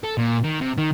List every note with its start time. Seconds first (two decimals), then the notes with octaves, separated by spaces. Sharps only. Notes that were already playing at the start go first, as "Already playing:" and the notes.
0.04 A4
0.18 A#2
0.44 D#3
0.61 C3
0.78 D#3